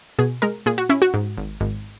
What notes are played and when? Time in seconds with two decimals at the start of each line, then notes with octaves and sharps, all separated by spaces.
0.19 B2 G#4
0.42 G#3 A#4
0.66 A#2 G#4
0.78 F#4
0.89 C#4 E4
1.02 F#4
1.14 G#2
1.37 G#1
1.60 G#1